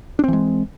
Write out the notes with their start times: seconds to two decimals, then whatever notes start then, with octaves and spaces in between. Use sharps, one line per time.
0.19 D4
0.24 C4
0.28 E3
0.33 G#3